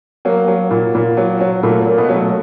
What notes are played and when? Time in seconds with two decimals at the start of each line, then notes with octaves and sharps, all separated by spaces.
0.25 F#3 A#3
0.48 F#3
0.71 A#2
0.95 A#2
1.17 F#3
1.40 F#3
1.63 A#2 A3
1.81 A#3
1.86 A#2
1.98 B2 B3
2.09 F#3
2.15 A3